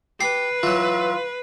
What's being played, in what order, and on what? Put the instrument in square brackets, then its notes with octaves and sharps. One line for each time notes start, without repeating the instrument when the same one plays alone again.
[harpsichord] G4 [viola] B4 [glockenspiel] C7
[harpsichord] E3 F#3 [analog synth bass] F4